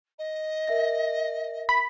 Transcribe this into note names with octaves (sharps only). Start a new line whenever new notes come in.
D#5
A#4 E5 A#6
B5